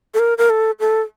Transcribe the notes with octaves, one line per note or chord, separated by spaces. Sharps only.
A4
A#4
A#4
A4
A4